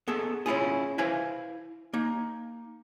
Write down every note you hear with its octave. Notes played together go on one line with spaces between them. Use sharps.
B3 G#4 A4
C#4 E4 F4 G#4
E4 B4 C5 F5 G#5
A#3 D#4